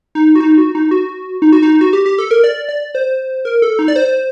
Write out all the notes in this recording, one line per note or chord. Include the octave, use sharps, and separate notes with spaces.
D#4
F#4
D#4
F#4
D#4
F#4
D#4
F#4
D#4
F#4
G4
G4
A4
A#4
D5
D5
C5
A#4
A4
D#4
D5
C5